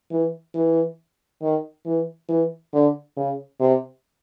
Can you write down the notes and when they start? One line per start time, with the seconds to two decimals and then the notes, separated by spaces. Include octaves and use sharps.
0.11 E3
0.54 E3
1.42 D#3
1.86 E3
2.29 E3
2.73 D3
3.17 C#3
3.60 C3